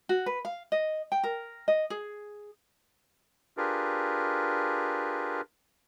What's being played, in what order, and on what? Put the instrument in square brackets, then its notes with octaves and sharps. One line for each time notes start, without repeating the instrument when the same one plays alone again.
[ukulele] F#4
B4
F5
D#5
G5
A#4
D#5
G#4
[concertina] D4 F4 G4 G#4 A#4 B4